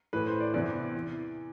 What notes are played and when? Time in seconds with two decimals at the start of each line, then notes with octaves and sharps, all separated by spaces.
0.13 A2 E3 B4
0.27 C5
0.40 D5
0.54 E2 C3 E3 D5
0.96 E3